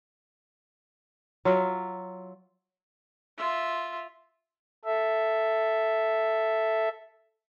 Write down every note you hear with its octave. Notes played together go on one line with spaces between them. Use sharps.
F#3 F4 E5
F4 E5
A4 E5